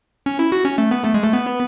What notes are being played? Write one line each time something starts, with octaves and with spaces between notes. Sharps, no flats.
C#4
E4
F#4
C#4
A3
B3
A3
G#3
A3
B3